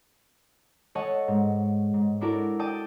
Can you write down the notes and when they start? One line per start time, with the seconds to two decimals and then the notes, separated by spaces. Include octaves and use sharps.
0.95 A4 C#5 D#5 F#5 A5
1.28 G#2
1.94 G#2
2.21 D4 E4 F#4 A4 A#4 D5
2.59 D5 G5 A5 D#6 A6 D7